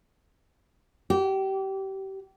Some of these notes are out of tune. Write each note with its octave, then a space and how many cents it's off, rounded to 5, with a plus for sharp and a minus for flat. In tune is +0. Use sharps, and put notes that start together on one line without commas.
G4 -25